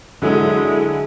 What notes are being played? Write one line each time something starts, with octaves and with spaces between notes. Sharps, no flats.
D3 F#3 G#3 E4